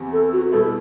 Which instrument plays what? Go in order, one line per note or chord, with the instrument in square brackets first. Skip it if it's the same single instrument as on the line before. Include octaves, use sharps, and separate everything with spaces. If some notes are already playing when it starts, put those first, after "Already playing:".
Already playing: [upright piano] E2 C3 E3
[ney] A4
F#4
[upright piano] B2 G3 B3 E4 [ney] A4